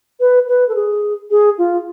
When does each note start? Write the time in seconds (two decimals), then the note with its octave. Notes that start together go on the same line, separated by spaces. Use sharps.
0.20 B4
0.48 B4
0.69 A4
0.75 G#4
1.31 G#4
1.58 F4